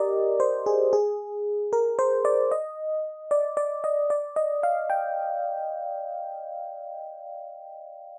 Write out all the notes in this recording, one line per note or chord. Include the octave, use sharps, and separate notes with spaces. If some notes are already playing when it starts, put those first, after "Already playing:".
Already playing: G4 A#4 D5 D#5
C5
G#4
G#4
A#4
C5
D5
D#5
D5
D5
D#5
D5
D#5
F5
G5